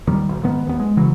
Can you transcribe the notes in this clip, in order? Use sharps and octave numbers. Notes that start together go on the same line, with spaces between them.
D#2 D#3 G3
D#1 B1
G#2 D#3 B3
D#2 B3
G#3
C#3 E3 F#3